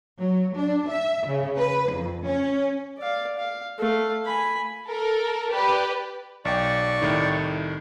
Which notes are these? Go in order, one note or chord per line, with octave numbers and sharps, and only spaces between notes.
F#3
D4
E5
C#3
B4
F2
C#4
D5 F5
F5
A3 F5
G#5 B5
A4 A#4
G4 B4 D5
B1 D5 G5 C#6
C2 A2 D#3